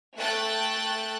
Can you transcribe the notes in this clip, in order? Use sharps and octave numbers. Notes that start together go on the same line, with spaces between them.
A3 G5 F#6 A6